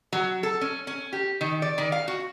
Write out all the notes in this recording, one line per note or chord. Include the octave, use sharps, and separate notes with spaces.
F#3
A4
C#4
C#4
G4
D#3
D5
D#3
F5
F#4